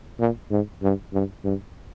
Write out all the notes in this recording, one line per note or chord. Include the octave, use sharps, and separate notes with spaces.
A#2
G#2
G2
G2
G2